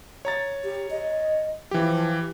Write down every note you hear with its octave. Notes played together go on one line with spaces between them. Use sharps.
C#5 A#5 A6
G4
D#5
E3 F3 G4